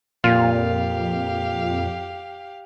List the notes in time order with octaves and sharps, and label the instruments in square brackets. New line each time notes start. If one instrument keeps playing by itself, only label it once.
[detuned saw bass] F2 [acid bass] A#2 [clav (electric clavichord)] F4 [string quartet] G4 F5